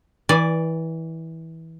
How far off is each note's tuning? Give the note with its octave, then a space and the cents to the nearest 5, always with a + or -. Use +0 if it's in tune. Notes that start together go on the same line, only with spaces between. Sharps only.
E3 -20 D5 +0 G#5 -5